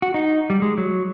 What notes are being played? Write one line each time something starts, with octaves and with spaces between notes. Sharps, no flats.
F#4
D#4
G3
G#3
F#3